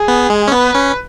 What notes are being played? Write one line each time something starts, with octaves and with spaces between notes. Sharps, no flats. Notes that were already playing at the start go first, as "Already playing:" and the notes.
Already playing: G#4
B3
G#3
C#4
B3 B4
C#4